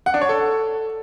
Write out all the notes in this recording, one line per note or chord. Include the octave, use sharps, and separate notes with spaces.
F#5
D4
C#5
A4